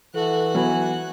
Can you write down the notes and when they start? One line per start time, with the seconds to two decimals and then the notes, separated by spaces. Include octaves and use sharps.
0.14 E3 F#4 A4 F#6
0.55 F#3 B3 G#5